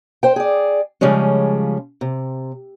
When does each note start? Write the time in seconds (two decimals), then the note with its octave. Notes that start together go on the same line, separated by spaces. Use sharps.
0.23 C5 G5
0.36 G#4 D5
1.01 C#3 F3 G3 G#3 C#4
2.01 C3